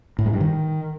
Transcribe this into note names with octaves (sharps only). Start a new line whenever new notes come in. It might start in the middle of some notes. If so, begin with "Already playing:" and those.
A2
G#3
G2
D#3